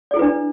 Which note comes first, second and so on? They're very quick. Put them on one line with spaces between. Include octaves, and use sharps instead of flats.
D5 G#4 E4 B4 D4